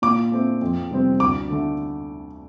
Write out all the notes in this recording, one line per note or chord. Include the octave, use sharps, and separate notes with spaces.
A#2 D6
A3 C4
F2
C3 G3 C4
D2 D6
D3 A3